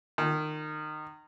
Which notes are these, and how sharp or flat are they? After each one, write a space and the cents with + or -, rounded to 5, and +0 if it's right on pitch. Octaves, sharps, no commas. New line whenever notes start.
D#3 -20